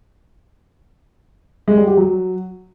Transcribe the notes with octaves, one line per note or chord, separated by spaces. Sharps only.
G#3
G3
G4
F#3